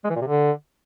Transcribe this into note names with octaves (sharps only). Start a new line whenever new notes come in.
G#3
E3
A#2
C3
D3